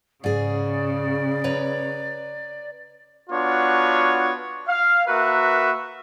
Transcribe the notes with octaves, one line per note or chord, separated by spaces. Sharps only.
G#2 C#3 G#4 D5
B4 C#5 A#5
B3 D4 F4 F#4 C#5
F5
A#3 F#4 A#4 B4 E5